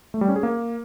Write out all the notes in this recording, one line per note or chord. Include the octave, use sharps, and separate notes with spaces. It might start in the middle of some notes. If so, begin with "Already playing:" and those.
A3
G3
C#4
G#4
A#3